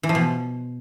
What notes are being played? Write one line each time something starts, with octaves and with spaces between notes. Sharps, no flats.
E3
F3
B2